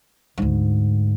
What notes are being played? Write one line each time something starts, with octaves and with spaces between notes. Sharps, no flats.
D2 G#2